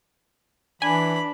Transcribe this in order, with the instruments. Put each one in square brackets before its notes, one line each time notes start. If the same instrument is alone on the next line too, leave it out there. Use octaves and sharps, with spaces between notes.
[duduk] E3 [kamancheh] D4 [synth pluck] G#5 [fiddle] B5